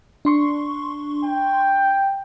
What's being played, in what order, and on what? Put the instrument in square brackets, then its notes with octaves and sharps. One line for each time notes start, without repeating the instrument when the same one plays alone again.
[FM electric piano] D4 C6 C#6
[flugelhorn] G5